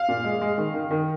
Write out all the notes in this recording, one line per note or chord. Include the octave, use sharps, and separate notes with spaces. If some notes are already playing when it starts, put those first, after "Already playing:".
Already playing: F5
A#2
G#3
G#3
D#3
D#3
D#3